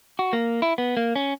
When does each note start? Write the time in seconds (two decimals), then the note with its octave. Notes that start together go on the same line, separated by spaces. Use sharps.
0.19 F#4
0.33 A#3
0.62 E4
0.78 B3
0.97 A#3
1.16 C#4